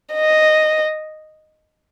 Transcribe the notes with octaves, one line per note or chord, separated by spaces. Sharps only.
D#5